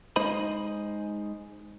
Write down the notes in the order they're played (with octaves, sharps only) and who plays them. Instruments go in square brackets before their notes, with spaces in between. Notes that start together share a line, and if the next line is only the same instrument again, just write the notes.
[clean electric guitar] G#3 D#4 C5 D#5 B5